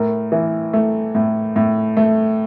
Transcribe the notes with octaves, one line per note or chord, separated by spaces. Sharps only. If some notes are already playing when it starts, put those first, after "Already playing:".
Already playing: A2 A#4
E3
A3
A2
A2
A3